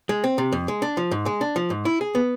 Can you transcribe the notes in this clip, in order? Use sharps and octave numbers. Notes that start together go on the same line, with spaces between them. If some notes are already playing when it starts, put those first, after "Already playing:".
G#3
C4
C3
F2
G#3
D4
F3
G#2
G#3
D4
F3
G#2
E4
G#4
B3